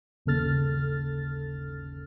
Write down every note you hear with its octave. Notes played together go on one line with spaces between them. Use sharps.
G1 D#2 C#3 A4 F6 A6